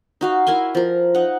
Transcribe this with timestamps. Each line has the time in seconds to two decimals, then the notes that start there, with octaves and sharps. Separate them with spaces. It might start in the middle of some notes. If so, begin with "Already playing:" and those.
0.21 D#4 F#4 F5
0.47 E4 A#4 G#5 C6
0.75 F3 A#4
1.15 D#4 F#5